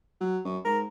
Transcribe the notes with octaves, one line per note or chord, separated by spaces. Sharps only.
F#3
F#2
G#2 A#4